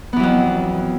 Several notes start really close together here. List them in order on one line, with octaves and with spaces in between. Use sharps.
B3 E3 F#3 F2